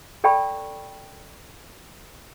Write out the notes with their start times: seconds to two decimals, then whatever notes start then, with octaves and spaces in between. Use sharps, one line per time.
0.24 A4 D5 G5 A5 B5 C#6